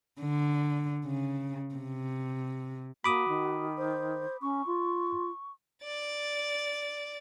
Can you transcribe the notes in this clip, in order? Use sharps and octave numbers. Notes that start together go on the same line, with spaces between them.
D3
C#3
C3
A#3 F#4 B5 D6 D#6
D#3
C5
C#4 C#6
F4
D5 A6